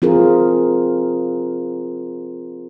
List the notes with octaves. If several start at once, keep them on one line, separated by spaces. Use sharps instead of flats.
C4 F4 G#4 A#4